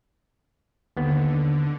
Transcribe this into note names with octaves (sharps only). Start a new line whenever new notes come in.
D#2 D3 B3